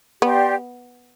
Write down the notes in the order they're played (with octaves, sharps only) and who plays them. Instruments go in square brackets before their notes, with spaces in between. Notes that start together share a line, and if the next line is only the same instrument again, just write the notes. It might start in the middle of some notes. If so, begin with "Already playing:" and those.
[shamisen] B3 [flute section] G4 D5 G5 C6